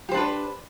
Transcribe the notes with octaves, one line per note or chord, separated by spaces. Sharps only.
D4 G4 B4 C5